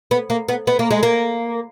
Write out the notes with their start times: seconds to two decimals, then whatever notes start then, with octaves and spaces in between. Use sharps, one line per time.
0.11 B3
0.30 A#3
0.49 B3
0.67 B3
0.79 A#3
0.91 G#3
1.03 A#3